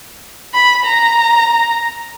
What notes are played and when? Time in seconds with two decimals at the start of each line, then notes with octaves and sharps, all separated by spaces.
0.54 B5
0.85 A#5